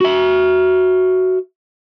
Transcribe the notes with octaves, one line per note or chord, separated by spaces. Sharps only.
F#4 E5